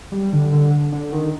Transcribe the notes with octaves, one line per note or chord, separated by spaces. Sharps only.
G3
D3
D3
D3
D#3